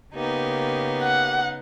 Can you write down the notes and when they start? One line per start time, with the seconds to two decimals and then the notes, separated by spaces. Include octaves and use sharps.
0.14 C#3 A#3 B3 D#4 G4
1.03 F#5